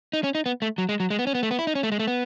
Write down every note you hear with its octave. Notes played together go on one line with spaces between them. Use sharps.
D#4
C#4
D#4
B3
A3
F#3
G#3
F#3
G#3
B3
C#4
B3
A3
B3
E4
D#4
C#4
A3
G#3
A3
B3